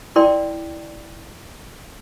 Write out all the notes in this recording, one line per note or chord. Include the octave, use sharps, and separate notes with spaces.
E4 A#4 D5 G5 C6